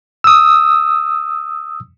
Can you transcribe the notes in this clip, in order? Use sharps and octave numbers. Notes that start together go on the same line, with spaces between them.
D#6 E6